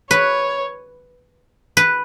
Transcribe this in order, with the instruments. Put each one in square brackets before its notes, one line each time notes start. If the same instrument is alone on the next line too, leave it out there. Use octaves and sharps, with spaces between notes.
[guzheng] B4 [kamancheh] C#5
[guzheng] B4